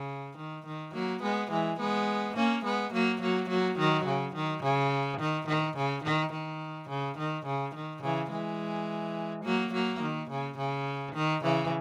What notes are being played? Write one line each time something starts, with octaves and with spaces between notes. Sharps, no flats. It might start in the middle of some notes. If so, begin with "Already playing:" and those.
Already playing: C#3
D#3
D#3
F#3 A#3
G#3 B3
E3 G#3
G#3 B3
A#3 C#4
G#3 B3
F#3 A#3
F#3 A#3
F#3 A#3
D#3 F#3
C#3
D#3
C#3
D#3
D#3
C#3
D#3
D#3
C#3
D#3
C#3
D#3
C#3 E3
E3 G#3
F#3 A#3
F#3 A#3
D#3
C#3
C#3
D#3
C#3 E3